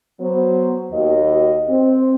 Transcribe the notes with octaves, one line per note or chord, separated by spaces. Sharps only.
F#3 B3 C5
D#2 F#4 D#5
C4